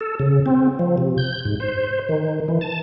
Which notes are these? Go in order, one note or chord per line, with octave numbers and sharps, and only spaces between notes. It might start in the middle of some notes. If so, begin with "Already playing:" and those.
A4
C#3
C4
F3
C3
G6
G#2
C5
D#3
E3
A5